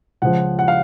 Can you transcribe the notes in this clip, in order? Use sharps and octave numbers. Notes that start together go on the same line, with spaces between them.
C#2 C#3 F3 F#5
F#5
F5